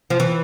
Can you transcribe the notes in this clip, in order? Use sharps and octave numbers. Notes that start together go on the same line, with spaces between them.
F3
E3